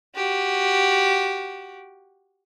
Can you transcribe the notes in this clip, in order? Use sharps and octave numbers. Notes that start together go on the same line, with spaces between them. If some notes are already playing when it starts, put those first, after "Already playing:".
F#4 G4